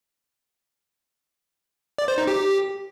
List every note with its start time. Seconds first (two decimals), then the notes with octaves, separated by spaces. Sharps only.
1.98 D5
2.08 C5
2.18 D#4
2.27 G4